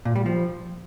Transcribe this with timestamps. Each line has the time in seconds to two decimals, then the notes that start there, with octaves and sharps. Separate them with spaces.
0.05 A#2
0.16 G3
0.26 F3